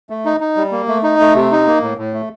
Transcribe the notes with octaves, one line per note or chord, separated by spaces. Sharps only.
A3
D#4
D#4
G3
A#3
A3
D#4
A3
C3
D#4
A#3
A2
A2
A3